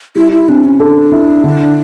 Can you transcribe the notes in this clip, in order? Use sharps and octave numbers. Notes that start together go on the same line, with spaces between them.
G3 E4
E4
C4 D4
C#4
D4 A4
E4
D3